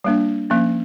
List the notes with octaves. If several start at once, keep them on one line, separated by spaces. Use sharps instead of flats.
G3 A#3 D4
F3 A#3 C#4